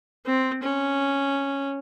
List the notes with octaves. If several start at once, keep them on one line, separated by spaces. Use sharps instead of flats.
C4
C#4